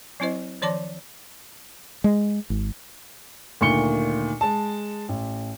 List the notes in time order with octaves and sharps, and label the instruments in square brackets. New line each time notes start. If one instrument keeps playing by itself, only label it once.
[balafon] F#3 C4 E4 C5 D#5
D#3 F3 C#5 D5 A5 D6
[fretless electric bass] G#3
G#1
[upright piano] D2 A#2 D#3 C#6 C#7 G7
G#3 A5
A1